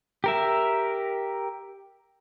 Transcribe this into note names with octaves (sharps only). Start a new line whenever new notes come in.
G4 A#4 E5